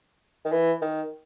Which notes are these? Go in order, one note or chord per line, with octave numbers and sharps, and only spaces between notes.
D#3
E3
D#3